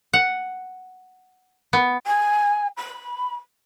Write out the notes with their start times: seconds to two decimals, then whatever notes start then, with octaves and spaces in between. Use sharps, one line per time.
0.13 F#5
1.73 B3
2.06 G#5
2.77 B5